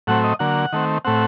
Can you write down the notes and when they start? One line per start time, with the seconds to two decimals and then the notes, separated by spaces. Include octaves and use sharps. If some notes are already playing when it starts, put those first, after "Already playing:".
0.07 A2 F#3 A3 C4 F#5
0.24 D#5
0.39 D3 F#3 A#3 F#5
0.73 D#3 A3 C4
1.05 A2 A3 C4 F#5